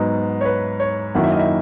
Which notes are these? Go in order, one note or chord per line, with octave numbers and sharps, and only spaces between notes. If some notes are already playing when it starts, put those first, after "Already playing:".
Already playing: G#2 F#3 B3 D#4
C#5
B4
C#5
F#2 D#3 F#3 A#3 E4 F#5
E5
D#5
E4 E5